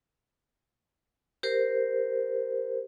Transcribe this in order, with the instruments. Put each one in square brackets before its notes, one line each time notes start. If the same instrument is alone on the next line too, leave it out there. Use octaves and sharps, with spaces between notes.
[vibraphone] G4 A#4 C5